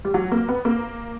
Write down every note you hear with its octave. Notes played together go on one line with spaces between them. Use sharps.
G3
F#3
A#3
B3
A#3